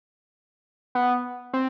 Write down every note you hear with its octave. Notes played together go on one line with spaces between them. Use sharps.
B3
C4